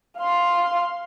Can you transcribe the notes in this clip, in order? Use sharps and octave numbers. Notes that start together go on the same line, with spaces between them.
F5 C6